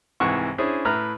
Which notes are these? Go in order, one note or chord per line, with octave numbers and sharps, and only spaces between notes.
C2 G#2 E3 F#5 C#6
C#4 D4 E4 G#4 C5
A2 E4 B4 A#5 F6